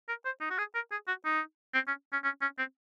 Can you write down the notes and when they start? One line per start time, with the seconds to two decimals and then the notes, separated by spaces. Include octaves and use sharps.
0.09 A#4
0.25 C5
0.41 D#4
0.51 F#4
0.58 G#4
0.75 A#4
0.92 G#4
1.08 F#4
1.25 D#4
1.74 C4
1.87 C#4
2.13 C#4
2.24 C#4
2.42 C#4
2.59 C4